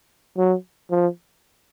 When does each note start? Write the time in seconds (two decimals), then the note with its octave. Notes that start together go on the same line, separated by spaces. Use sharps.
0.38 F#3
0.91 F3